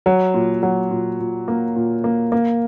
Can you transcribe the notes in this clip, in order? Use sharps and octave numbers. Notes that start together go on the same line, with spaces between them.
F#3
A#2
F#3
A#2
A#2
A#3
A#2
A#3
A#3